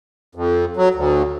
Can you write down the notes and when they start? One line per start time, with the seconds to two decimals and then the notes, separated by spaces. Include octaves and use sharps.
0.35 F2
0.77 F#3
0.94 D2